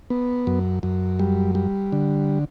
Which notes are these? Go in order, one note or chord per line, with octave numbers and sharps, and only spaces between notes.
B3
F#2
F#2
G3
G3
D3